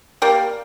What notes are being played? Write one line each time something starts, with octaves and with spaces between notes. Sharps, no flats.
G3 A#3